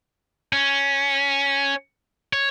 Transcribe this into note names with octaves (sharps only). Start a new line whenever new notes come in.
C#4
C#5